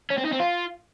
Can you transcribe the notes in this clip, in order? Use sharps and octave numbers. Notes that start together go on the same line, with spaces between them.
C#4
C4
D#4
C4
F4